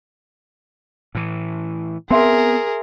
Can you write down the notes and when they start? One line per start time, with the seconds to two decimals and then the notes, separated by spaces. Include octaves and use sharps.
1.15 A2 E3
2.11 B3 C4 G#4 A#4 E5 C6